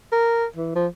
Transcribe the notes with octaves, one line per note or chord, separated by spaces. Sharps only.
A#4
E3
F3